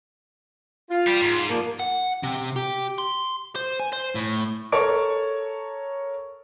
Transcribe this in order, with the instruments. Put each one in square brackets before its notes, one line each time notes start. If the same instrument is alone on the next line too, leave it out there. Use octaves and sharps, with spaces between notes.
[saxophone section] F4
[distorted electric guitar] G3
G#2
[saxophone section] F3 G3 A#3
[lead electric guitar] F#5
C3
G4
C6
C5
G#5
C5
A2
[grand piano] A4 A#4 C#5 A5 C#6 D7